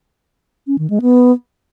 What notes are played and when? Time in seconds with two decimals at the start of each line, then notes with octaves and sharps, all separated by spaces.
0.67 C#4
0.78 D#3
0.90 G#3
1.02 B3